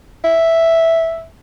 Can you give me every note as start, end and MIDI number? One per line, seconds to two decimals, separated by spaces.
0.24 1.24 76